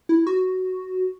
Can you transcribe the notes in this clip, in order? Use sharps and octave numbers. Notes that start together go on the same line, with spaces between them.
E4
F#4